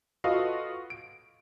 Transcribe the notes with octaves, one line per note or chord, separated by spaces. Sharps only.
F4 F#4 A4 B4 D#5 F5
D7